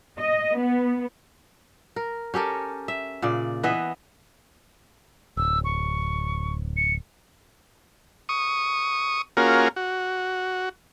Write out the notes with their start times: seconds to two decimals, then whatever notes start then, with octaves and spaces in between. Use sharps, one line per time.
0.19 D#5
0.58 B3
1.96 A#4
2.34 C#4 G4 A4 A#4
2.88 E5
3.22 A#2 C#3 D5
3.63 E3 B3 D#5 E5
5.37 D1 E6
5.65 C#6
6.77 C#7
8.29 C#6 D#6
9.37 A#3 C#4 F4 F#4 G#4 A#4
9.76 F#4